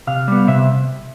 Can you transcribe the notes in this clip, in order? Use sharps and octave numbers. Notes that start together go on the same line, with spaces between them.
C3 F5
G3 B3
C3 E5